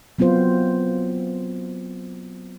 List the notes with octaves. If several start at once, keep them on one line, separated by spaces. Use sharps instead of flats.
F#3 B3 C4 F4 C5